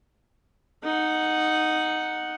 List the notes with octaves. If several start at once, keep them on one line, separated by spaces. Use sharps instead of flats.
D#4 F#5